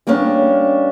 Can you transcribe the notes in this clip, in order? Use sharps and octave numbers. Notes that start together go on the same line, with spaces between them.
G3 A#3 B3 C#4 D4